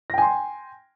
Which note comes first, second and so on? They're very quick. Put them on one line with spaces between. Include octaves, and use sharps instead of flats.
A#6 G5 G#5 C6